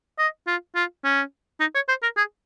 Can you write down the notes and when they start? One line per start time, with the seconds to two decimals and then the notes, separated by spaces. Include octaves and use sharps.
0.19 D#5
0.47 F4
0.76 F4
1.04 C#4
1.60 D#4
1.75 C#5
1.89 C5
2.03 A#4
2.17 G#4